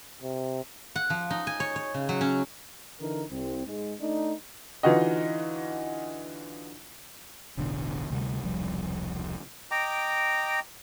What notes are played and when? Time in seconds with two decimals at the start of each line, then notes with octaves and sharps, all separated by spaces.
0.22 C3
0.95 F#5
1.10 F3
1.30 D#4
1.47 G#5
1.60 C#5
1.76 C#5
1.94 C#3
2.09 F#3
2.21 C#4
3.00 D3 E3 D#4 A#4
3.31 C2 C4
3.66 G#2 G#3
4.00 A3 D4 D#4
4.83 D3 E3 D#4 F4 F#4 D#5
7.57 E1 A1 B2 D3
8.10 D2 C3 G3
8.42 E1 C2 F3 G3
9.71 D#5 G5 A#5 D6